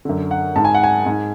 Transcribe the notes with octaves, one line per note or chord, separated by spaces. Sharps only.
F#2 D3
F#5
G#2 A5
G#5
F#5
G#5
G#2